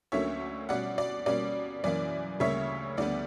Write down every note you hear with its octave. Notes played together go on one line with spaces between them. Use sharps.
D2 D3 F#3 A#3 C#4 C#5 E5
B2 G3 C#4 D5 F#5
D5
B2 G3 A#3 C#4 D5
F#2 E3 A#3 C#4 D5
D2 C#3 G3 A#3 C#5 E5
D2 D3 G3 B3 D5